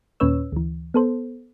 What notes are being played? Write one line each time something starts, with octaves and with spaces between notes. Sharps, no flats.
D#2 A#2 C#4 B4 C#5 E6
D2 E3
B3 A4 C5